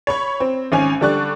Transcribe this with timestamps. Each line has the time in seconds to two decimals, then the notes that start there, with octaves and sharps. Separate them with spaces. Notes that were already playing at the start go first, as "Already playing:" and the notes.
0.07 C#5 B5 C#6
0.40 C4
0.72 G#1 C#4 G#5 F7
1.01 D3 G3 D5 C#6 F#6